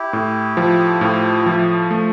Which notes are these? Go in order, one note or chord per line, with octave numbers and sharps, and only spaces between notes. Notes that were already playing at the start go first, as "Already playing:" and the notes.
Already playing: E4 G4
A2
F3
A2
F3
A3